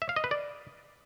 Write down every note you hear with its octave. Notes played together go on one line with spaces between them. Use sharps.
E5
F5
D#5
B4
D5